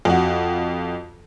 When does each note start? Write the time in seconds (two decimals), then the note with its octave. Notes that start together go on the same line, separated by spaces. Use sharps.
0.05 F2 F#4